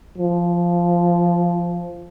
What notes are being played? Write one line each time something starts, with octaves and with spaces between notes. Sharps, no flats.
F3